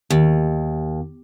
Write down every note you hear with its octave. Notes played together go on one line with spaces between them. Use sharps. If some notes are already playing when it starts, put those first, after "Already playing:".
D#2